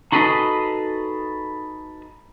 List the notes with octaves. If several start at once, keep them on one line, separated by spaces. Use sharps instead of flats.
D#4 F#4 G#4 A4 B4 D#5